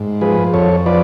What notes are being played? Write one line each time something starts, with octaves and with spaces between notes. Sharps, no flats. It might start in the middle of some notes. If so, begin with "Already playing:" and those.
Already playing: G#2
F3 G#4 B4
F2 A4 C#5
F3 B4 D5